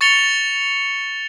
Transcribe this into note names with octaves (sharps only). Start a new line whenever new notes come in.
C#6 A6 C#7 F7 G7